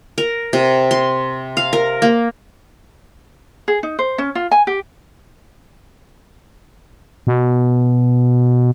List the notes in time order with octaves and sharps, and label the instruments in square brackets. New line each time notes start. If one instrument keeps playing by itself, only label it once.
[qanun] A#4
C3
C6
F5
A#4
A#3
[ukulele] G#4
D#4
C5
C#4
F4
G#5
G4
[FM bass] B2